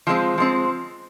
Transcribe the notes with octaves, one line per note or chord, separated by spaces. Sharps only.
F3 G#3 C4
F3 G#3 C4